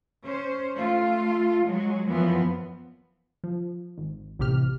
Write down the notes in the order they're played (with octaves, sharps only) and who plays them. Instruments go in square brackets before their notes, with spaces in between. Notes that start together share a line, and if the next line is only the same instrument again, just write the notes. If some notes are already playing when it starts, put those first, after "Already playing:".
[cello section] C#4 C5
A3 F4
F#3 G#3
F#2 E3 F3 B3
[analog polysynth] F3
G#1
A1 C3 G4 F6